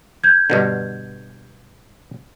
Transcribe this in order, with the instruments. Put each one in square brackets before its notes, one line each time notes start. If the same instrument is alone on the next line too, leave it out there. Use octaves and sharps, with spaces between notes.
[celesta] G6 G#6
[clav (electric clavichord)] G2 B2 D3